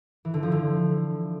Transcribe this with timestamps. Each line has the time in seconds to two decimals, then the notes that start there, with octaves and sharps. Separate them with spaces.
0.25 E3
0.34 D3
0.43 F3
0.52 D3